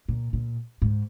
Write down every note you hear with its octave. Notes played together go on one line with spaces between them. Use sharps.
A#2
A#2
G#2